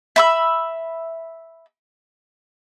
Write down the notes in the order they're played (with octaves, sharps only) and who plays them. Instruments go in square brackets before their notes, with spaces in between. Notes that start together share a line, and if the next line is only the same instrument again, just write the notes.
[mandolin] E5 B5 E6